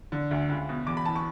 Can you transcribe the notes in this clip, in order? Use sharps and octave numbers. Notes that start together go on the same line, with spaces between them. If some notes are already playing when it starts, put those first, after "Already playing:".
D3
D2
C#2
B2
E2 D6
B5
E3 A5
C#6